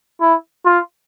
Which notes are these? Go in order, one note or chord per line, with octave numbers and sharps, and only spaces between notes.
E4
F4